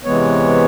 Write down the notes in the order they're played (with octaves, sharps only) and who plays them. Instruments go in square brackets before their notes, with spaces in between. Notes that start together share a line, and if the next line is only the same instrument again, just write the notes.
[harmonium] C3 E3 G#3 B3 C#5